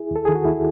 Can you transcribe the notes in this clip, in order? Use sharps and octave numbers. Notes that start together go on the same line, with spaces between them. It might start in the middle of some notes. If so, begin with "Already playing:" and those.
Already playing: E4 G#4
D#2 A4
D#3 G#4
F#4
D#2 E4